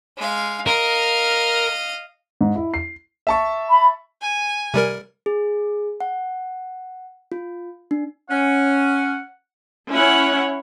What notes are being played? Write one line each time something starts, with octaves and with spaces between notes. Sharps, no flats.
G#3 F5
A#4 D#5 F5
G#2
E4
C7
E5 A5 C#6
B5
G#5
C3 G3 A#4
G#4
F#5
F4
D4
C#4 F#5
C#4 E4 C#5 F#5